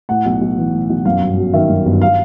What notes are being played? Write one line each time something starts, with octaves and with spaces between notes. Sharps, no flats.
A2 F#5
B1
B1
E3
A2
B1
F#2 F5
G1
F#3
D#3 E5
F#2
G1
F5